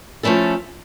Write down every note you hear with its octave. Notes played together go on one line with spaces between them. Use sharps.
F3 A3 C#4 E4 A4